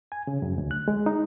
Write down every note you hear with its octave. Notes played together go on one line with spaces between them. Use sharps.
G#5
C#3
F#2
D2
F#6
G#3
D#4